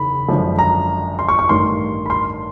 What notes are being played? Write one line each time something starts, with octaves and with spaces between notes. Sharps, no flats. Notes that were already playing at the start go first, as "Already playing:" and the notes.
Already playing: F#1 E2 D#3 B5
G#1 F#2 D3 F3
A#5
C6
C#6
C#6
A1 G2 D#3 C6
B5
C6